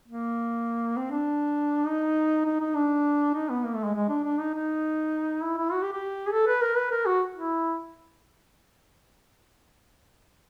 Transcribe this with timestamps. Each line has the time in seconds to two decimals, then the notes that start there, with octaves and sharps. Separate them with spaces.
0.08 A#3
0.97 C4
1.11 D4
1.86 D#4
2.45 D#4
2.60 D#4
2.75 D4
3.34 D#4
3.49 B3
3.64 A#3
3.75 A3
3.84 G#3
3.95 G#3
4.09 D4
4.24 D4
4.39 D#4
4.54 D#4
5.43 E4
5.57 E4
5.72 F#4
5.82 G4
5.92 G4
6.27 G#4
6.32 A4
6.47 B4
6.61 A#4
6.76 B4
6.91 A#4
7.06 F#4
7.36 E4